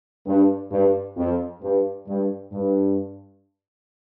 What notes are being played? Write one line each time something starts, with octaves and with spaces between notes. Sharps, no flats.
G2
G2
F2
G2
G2
G2